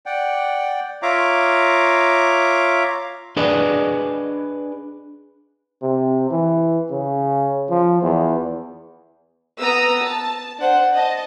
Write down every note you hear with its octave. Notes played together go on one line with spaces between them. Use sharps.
D5 F#5 G5
F4 C#5 E5 F5 A#5 D6
D4 G#4 B4 D5 D#5
C3
E3
C#3
F3
E2
B3 A#5 D#6 E6
A5
D4 C5 F#5
D#5 A5